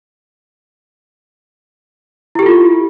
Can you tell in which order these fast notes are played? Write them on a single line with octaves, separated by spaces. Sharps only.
E4 G4 A4 F4